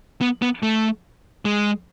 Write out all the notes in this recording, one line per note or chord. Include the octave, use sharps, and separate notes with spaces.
B3
B3
A3
G#3